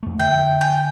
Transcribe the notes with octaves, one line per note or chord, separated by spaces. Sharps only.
F2 A3
D3 E5 G5
G5 G#5